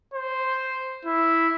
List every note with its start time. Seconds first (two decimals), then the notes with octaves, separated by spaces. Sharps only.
0.14 C5
1.05 E4